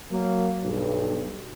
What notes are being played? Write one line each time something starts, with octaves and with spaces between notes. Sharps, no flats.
F#3 A#3
B1 G2